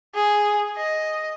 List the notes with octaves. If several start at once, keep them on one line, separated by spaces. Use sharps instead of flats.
G#4
D#5